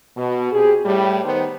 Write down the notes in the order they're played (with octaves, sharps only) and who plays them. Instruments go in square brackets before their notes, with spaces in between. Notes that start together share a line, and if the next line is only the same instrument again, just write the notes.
[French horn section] B2
C4 G4 G#4
A2 G3
D#3 B3 C5